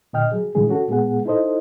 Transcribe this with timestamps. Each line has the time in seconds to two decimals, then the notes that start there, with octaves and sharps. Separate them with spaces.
0.13 A#2 D3 D#5 G5 F6
0.32 F#3 G#4
0.55 A#2 D3 E3 G3 G#3 G#4
0.69 C#4 F#4 A4
0.88 A#2 G#3 B3 G#4 F#5
1.25 D#4 E4 A4 C5 D#5